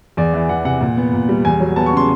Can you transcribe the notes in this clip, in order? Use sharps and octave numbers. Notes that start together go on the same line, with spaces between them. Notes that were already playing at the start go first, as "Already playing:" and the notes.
E2 D5
E3
E2 F#5
C3 F#5
A#2
B3
A#2
G3
E2 G#5
F#3
B3 A5
C#6
C#3 C6